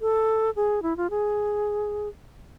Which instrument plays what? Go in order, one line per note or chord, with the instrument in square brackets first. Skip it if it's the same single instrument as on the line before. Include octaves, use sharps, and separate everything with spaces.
[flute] A4
G#4
E4
F4
G#4